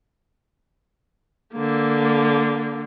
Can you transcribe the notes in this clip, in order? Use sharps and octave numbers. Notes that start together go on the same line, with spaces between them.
D3 A#3